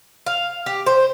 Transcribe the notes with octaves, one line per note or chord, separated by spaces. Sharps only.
F5
G4
C5